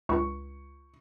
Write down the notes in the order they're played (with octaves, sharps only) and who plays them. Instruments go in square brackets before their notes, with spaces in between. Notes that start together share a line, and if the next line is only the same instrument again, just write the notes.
[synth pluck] C#2 [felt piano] C#6